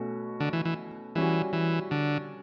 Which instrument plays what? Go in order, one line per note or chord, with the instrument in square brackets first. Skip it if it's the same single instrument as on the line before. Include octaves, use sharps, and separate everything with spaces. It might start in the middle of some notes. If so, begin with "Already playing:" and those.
Already playing: [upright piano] B2 A3 C#4 F#4
[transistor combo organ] D3
E3
E3
[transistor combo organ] E3 [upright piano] G3 C#4 F#4
[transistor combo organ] E3
D3